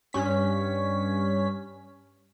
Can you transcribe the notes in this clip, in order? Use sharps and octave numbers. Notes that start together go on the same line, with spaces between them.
G2 C#4 B6